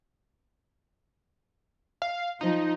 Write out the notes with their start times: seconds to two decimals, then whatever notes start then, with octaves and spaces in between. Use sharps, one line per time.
2.02 F5
2.41 F3 D#4